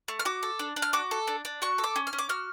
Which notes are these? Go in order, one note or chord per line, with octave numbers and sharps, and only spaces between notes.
A3
F6
F#4 D6
A4
D4
D4
F6
F#4 D6
A4
D4
D4
F#4 C#6
A4
D6
C#4
F6
C#4
D6
F#4 F6